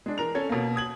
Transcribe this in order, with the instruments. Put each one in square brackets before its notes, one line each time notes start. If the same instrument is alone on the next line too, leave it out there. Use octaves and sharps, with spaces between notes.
[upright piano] G#3 D4
E3 A#4 F7
C#4 A4 G#6
B2 A#3
D#6 G#6 F#7